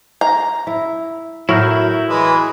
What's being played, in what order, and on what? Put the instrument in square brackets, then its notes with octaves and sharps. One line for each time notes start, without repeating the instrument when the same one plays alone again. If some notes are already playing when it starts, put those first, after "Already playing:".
[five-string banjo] A#5
[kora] E4
[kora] A2 F#3 A#4 [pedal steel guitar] E4 F6 G6
[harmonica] E3 G#3 B4